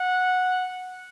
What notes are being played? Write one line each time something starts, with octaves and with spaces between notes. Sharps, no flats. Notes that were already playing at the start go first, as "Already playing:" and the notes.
Already playing: F#5